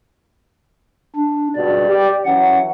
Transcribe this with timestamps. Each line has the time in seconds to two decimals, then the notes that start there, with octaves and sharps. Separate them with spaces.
1.16 D4
1.55 C#2 G2 B2 D5
1.89 G4
2.25 E3 F#3 C#4 F#5